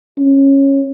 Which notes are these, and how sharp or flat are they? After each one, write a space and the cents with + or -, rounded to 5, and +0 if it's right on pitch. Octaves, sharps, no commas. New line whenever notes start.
C#4 -15